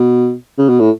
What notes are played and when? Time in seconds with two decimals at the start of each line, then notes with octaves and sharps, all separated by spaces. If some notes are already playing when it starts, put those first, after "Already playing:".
Already playing: B2
0.58 C#3
0.69 B2
0.80 A2